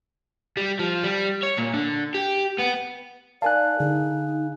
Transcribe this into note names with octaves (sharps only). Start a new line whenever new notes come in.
G3
F3
G3
C#5
A#2
D3
G4
B3
D#4 A#4 D5 F5 G#5 A5 F#6
D3 D#4 G#4